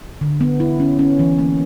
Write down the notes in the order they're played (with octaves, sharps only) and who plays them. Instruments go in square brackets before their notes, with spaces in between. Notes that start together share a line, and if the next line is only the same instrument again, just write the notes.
[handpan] D3
B3
E4
C#4
C#4
E3
A#3